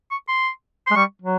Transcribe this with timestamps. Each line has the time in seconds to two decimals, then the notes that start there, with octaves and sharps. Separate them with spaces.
0.11 C#6
0.28 C6
0.86 G#3 C6
0.95 G3 C#6
1.22 F#3